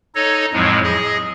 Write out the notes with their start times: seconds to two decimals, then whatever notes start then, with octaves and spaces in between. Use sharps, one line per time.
0.15 D#4 A4 C#5 D#5
0.53 F2 A2 F3 F#3 G#3
0.83 G#4 D#5